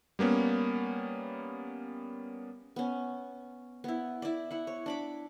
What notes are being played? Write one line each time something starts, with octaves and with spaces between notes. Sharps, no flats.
G3 A#3 B3 C#4
B3 C#4
B3 E4
E4 D5
E4 F#5
C#5
D4 B5 D6